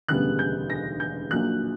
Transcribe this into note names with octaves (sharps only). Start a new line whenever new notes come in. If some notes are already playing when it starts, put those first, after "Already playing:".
E1 D2 C#3 G3 B3 F#6
G6
A#6
G6
A#1 A#2 F#3 A#3 F#6